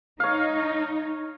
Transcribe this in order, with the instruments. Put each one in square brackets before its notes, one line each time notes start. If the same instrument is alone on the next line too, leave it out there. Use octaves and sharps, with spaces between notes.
[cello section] D#4 [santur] C#5 F5